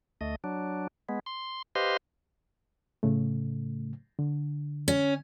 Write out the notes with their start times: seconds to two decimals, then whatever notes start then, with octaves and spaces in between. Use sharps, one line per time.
0.21 D2 A3 D#5
0.44 F#3 D4
1.09 G#3 B3
1.26 C6
1.75 G4 B4 C5 D#5 F5 C6
3.03 A2 C#3 A3
4.19 D3
4.88 C#4